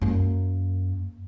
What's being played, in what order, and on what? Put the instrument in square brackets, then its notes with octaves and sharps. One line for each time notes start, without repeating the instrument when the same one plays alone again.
[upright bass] F#2 A#3